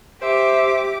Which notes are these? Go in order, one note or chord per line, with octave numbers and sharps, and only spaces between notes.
G4 C5 E5 D6